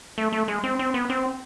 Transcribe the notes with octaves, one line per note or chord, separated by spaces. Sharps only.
A3
A3
G#3
C4
C4
B3
C4